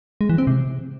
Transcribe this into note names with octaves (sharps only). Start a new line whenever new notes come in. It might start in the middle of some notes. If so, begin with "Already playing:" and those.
G#3
E3
C4
C3